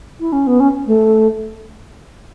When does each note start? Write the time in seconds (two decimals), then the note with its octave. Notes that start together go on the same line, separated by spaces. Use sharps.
0.20 E4
0.33 C#4
0.47 B3
0.60 C#4
0.87 A3